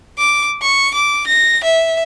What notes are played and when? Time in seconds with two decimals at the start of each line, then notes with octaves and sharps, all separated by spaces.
0.18 D6
0.62 C#6
0.94 D6
1.27 A#6
1.64 E5